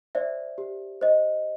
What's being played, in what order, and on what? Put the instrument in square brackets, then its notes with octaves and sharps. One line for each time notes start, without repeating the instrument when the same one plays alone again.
[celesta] C5 D5 E5
G4
C5 D#5